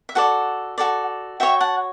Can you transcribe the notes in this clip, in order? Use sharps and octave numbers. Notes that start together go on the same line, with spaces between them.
E5
F#4 A4 D5 F#5
F#4 A4 D5
F#4 C#5 E5 G5
F#5 A5